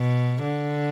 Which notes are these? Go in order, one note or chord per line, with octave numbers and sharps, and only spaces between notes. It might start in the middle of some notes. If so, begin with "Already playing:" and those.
Already playing: B2
D3